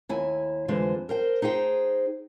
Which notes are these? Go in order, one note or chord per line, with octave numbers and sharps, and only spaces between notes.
D#2 E4 G#5
F2 D3 E3 G#3 C5
A#4 C5 G5
D#4 G#4 C5 G5